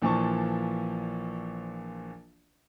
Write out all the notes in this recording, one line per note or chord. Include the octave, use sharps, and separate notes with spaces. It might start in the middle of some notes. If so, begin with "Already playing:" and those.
A#1 A#2 E3 F3 A5 C#6